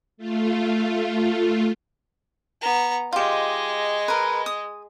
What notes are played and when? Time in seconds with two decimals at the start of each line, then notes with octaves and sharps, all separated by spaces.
0.17 A3 F4
2.61 B3 A#5
3.13 G#3 F4 G4 D#5
4.08 A#4 B4
4.46 D#6